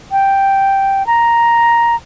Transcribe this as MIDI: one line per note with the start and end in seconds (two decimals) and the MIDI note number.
0.12 1.06 79
1.07 1.96 82